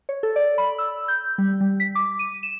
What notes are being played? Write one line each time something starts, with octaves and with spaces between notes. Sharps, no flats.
C#5
A4
D5
B5
E6
G6
G3
G3
B6
D6
D#7
E7